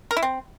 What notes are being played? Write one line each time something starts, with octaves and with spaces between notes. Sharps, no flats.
A#4
E4
C4